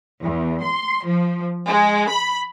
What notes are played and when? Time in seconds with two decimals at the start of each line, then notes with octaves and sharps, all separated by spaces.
0.23 E2
0.63 C6
1.06 F3
1.67 G#3
2.09 B5